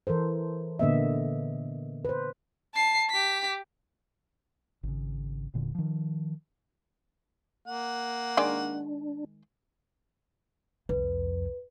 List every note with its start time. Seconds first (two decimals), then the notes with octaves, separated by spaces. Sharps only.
0.07 E3 A4 A#4 C5
0.79 A#2 D3 A#3 B3 D#5 E5
2.05 B4 C5
2.74 A5 C7
3.10 G4 B6
4.83 G#1 C#3
5.54 E1 A#2 D3
5.75 D#3 F3
7.66 A#3 F#5
8.37 D#3 G#3 D4 D5
10.89 C2 F2 B4